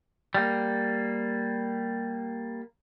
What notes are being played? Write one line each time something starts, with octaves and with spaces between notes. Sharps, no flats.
G3 A#3